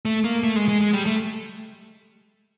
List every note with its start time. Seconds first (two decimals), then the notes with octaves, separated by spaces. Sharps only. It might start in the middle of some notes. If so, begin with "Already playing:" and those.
0.05 A3
0.24 A#3
0.44 A3
0.56 G#3
0.68 G#3
0.81 G#3
0.93 G3
1.06 A3